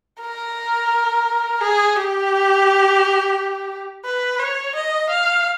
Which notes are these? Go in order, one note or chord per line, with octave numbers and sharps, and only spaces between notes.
A#4
G#4
G4
B4
C#5
D#5
F5